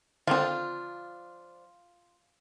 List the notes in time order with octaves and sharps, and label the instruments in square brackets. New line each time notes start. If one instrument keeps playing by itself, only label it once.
[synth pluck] D3 D#3 C4 [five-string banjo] F3 D4 [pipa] F4